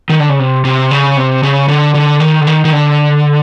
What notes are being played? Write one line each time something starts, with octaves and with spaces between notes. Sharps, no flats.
D#3
D3
C#3
C3
C3
C#3
C3
C#3
D3
D3
D#3
D3
D#3
D#3
D3